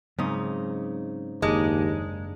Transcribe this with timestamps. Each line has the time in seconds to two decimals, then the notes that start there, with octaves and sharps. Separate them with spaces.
0.19 G#2 C#3 F#3 C4 D#4
1.42 F#1 D#2 G#3 D4 D#4